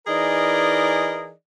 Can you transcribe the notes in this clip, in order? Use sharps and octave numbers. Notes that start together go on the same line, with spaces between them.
E3 D#4 G#4 A#4 D5 D#5